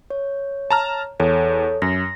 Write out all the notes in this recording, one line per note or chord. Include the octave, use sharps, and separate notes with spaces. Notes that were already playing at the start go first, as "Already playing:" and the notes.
C#5
A5 A#5 F6
E2 A4 C#5
F#2 A#6